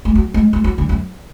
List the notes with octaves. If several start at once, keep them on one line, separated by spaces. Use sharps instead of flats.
G#3
F#3
G#3
G#3
F#3
D3
F#2